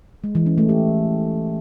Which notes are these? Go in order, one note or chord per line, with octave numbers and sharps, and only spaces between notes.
G#3
E3
C#4
A3
G4